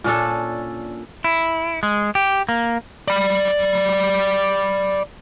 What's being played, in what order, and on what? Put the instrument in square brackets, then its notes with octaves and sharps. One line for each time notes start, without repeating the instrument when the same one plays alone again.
[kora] A#2 C#4 D4 A4
[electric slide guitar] E4
G#3
G4
A#3
[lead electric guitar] D5 B5